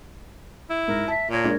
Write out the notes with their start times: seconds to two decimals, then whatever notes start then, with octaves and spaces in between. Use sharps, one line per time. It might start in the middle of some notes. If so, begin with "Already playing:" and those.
0.70 E4
0.88 G#2 A#4
1.08 E5 A5
1.30 A#2 A#4 C#5
1.44 G#3 A#3 D4